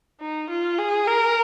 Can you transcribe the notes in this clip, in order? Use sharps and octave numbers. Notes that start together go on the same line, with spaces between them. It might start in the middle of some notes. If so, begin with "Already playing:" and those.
D#4
F4
G#4
A#4